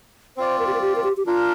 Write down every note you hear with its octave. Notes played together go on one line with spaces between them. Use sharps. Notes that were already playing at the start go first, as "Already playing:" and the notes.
C4 F4 C5 D5
A#4
G4
A#4
G4
A#4
G4
G4
D4 F4 A#4 F5